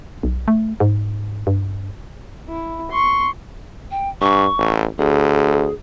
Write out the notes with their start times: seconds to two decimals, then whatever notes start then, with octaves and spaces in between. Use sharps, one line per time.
0.23 B1
0.48 A3
0.80 G#2
1.47 G2
2.48 E4
2.91 C6 C#6
3.91 G5
4.21 G2 C#6
4.58 A1
4.99 D2 G#4